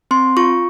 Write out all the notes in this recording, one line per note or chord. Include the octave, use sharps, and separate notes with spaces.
C4 C6
F4 C#6